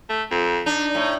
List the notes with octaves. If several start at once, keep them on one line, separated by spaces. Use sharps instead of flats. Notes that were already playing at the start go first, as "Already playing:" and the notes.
A3
F2
D4 D#4
A2